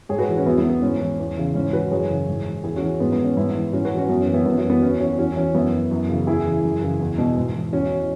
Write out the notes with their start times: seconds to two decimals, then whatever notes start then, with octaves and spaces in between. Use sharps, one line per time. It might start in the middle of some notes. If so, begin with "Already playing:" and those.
0.09 G#2 G#4 C#5
0.18 F#4 B4
0.28 E3
0.37 C#4 F#4
0.45 E2 B3 E4
0.58 B3 E4
0.64 E3
0.70 B3
0.82 G#2 C#4
1.00 E3
1.19 E2
1.37 C#3 E3
1.55 G#2 C#4
1.73 E3 F#4 B4
1.91 F#2 G#4 C#5
2.09 C#3 E3
2.27 G#2
2.46 E3
2.64 E2 E4 G#4
2.76 C#4 F#4
2.82 E3
3.00 G#2 B3
3.12 B3
3.19 E3
3.25 C#4
3.37 G#2 B3 E4
3.55 E3
3.73 G#2 C#4 F#4
3.85 F#4 B4
3.92 E3
3.98 C#4 F#4
4.09 F#2 B3
4.22 C#4
4.28 E3
4.34 B3 E4
4.46 F#2 B3 E4
4.58 C#4 F#4
4.64 E3
4.70 B3
4.82 E2 C#4
5.00 E3 C#4 F#4
5.18 E2 C#4 F#4
5.36 E3 C#4
5.54 F#2 B3 E4
5.73 E3
5.91 F#2
6.09 C#3 E3
6.27 E2 E4 G#4
6.46 C#3 E3
6.64 F#2
6.82 C#3 E3
7.00 E2
7.18 B2
7.37 G#2
7.55 E3
7.72 E2 C#4 F#4
7.91 E3